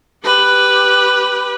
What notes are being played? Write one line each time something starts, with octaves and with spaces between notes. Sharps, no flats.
G4 B4